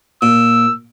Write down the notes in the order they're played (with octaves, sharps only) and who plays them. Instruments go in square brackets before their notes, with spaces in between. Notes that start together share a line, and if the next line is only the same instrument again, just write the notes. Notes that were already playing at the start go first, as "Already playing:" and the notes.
[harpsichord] A#2 [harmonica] E6